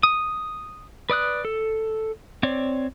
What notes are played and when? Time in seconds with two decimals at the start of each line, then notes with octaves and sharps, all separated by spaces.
0.03 D#6
1.10 B4 D5 D#6 F#6
1.45 A4
2.43 C4 C#5 D5